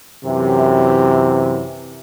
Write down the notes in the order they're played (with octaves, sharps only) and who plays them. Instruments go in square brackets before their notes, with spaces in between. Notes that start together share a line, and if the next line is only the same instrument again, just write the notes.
[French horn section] F#2 C3 E3